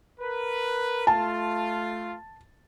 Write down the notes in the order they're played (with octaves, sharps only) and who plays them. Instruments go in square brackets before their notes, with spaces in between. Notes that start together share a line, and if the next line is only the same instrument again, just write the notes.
[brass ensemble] A#4 B4
[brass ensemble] A3 F4 [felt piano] A5